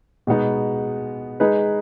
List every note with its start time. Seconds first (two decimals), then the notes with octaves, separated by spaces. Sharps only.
0.27 B2 G#3 B3 D#4
1.40 G#3 D#4 G#4 B4